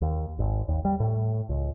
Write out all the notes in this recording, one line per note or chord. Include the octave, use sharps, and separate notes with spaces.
D#2
G#1
D#2
G3
A2
C#2